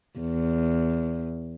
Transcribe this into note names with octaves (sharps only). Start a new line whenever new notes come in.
E2